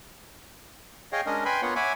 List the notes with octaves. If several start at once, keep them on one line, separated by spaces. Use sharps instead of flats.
G#4 C#5 D#5 F5 G5
G#3 C#4 D4 A#4 D#5
B4 G5 G#5 B5 C6
A#3 B3 F4 C#5 F#5
C#5 E5 F#5 G#5 B5 D6